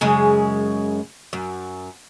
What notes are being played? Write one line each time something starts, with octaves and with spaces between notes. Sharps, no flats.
F#2 C#3 G#3
F#2